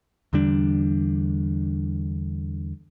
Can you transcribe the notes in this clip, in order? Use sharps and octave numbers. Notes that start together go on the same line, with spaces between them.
E2 D3 G3 D4